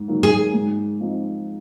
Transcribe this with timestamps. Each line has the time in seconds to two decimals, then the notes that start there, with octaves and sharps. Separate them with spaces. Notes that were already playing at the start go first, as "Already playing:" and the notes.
Already playing: G#2
0.08 D#3 F#3 A#3
0.23 G#4
0.54 G#2
1.00 F3 C4 D#4